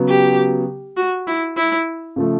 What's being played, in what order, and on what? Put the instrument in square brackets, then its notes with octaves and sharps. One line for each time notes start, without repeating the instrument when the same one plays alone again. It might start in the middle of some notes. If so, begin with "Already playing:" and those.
Already playing: [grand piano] C#3 F#3 B3
[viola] G4
F#4
E4
E4
[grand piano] C#3 F3 A3